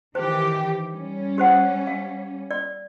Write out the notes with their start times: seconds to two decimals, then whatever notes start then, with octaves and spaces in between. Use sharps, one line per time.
0.15 D#3 E3 G4 C5
0.91 G3 C#4
1.38 G4 C5 F#5
1.87 F5
2.51 D5